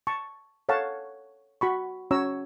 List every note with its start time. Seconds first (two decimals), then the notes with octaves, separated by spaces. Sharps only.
0.07 A5 C#6
0.69 A4 C#5 F5 F#5 A5
1.61 F#4 B5 C#6
2.11 C#4 F#4 C#5 A#5 E6